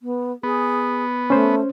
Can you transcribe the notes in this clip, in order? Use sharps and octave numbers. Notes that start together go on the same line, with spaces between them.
B3
B3 G#4
A3 C#4 C5